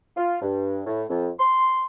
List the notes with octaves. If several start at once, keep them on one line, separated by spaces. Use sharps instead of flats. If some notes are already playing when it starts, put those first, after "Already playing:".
F4
G2
A2
F2
C6